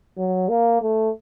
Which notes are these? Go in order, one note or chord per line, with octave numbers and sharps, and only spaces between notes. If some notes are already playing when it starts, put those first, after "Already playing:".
F#3
A#3
A3